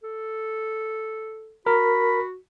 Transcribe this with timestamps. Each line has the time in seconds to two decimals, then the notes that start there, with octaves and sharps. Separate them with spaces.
0.03 A4
1.66 F#4 A#4 B5